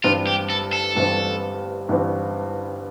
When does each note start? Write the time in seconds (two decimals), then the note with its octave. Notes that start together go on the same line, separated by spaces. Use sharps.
0.04 G1 G2 E3 G3 C4 F4
0.27 G4
0.50 A4
0.73 A4
0.95 G1 G2 E3 G3 C4
1.89 G1 G2 E3 G3 C4